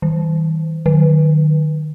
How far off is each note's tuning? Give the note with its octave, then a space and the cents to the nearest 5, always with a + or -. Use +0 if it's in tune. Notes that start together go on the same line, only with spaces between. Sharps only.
D#3 +45
D#3 -35